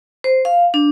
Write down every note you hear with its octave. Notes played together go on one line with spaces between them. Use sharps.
C5
F5
D4